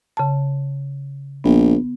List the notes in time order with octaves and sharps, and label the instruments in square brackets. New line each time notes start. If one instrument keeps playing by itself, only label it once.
[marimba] C#3 A5
[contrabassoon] A#1 [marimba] B3